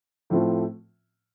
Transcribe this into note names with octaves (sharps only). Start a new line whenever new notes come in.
A2 F3 A3 C4 F4